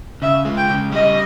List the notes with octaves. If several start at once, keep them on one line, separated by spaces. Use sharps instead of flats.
C#3 E5
G#3
G5
C#3
G3 D#5